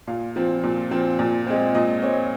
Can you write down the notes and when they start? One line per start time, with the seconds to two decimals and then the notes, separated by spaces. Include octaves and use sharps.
0.07 A#2 F5
0.36 F3 C4
0.63 A#2
0.91 F3 C4
1.19 A#2
1.46 G#3 C4
1.74 A#2 D#5
2.02 G#3 C4 C#5